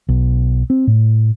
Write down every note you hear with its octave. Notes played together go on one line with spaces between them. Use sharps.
B1
C4
A2